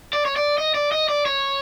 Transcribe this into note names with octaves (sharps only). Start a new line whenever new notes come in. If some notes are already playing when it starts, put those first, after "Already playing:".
D5
C#5
D5
D#5
D5
D#5
D5
C#5